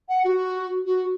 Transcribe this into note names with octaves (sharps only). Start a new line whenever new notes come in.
F#5
F#4
F#4